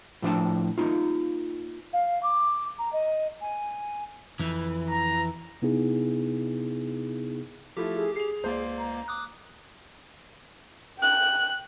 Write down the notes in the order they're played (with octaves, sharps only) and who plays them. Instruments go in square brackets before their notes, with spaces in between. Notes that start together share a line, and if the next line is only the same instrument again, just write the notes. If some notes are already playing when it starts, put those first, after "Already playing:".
[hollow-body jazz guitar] A2 F3 D4 G5 A5
A#3 D#4 F4
[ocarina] F5
D6
A#5
D#5
G#5
[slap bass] F2 [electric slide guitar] E3
[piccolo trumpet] A#5
[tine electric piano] C3 B3 D#4 E4 G#4
[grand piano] F3 A3 E4 [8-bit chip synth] G4
[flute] G#4
[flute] G#4 [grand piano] C7 F7
[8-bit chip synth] C#2 A#3 [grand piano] C5 D5
[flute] A#5
[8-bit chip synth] D6 D#6 F#6
[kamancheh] G5 F#6